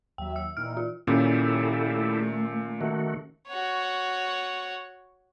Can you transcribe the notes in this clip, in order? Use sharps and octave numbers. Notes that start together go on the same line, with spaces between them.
D#2 F#3 E5 G5
E6
A#2 E3 D#4 F6
F4
A#2 D#3 C#4 E4 G4 A4
A3
D#3 A3 F#4
F#4 C#5